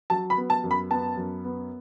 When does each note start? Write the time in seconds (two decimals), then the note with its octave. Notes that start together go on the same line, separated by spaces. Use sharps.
0.10 F#3 A5
0.30 B5
0.37 B3
0.50 A5
0.64 F#2
0.71 B5
0.91 B3 A5
1.17 F#2
1.44 B3